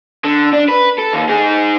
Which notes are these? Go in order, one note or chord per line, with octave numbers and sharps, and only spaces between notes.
D3
D4
B4
A4
D#2
D#4 G#4